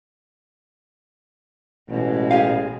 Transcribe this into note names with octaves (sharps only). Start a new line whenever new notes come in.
A1 B2 G#3
G4 G#4 F5